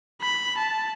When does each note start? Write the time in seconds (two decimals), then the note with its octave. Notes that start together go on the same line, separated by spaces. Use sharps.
0.22 B5
0.57 A5